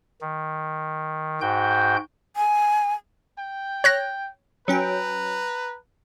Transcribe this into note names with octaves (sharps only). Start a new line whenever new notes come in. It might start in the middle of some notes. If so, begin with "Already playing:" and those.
D#3
G#2 F#4 G5 G6
G#5
G5
C#5 F#6 A#6
F#3 C#4 B4 G5 A#5